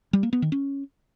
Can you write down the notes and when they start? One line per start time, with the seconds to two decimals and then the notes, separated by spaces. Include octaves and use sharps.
0.13 G3
0.23 A#3
0.33 B3
0.42 D#3
0.52 C#4